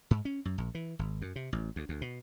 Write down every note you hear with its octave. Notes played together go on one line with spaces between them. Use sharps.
G#2
C#4
F#2
A#1
E3
G#1
F#2
C3
A1
D2
D2
B2